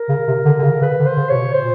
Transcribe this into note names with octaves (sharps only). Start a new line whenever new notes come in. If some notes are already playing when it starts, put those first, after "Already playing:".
Already playing: A#4
C#3
C3
D3
D3
C#3
C#3 B4
D3
C5
C#3
C3 C#5
B2
A#2 C5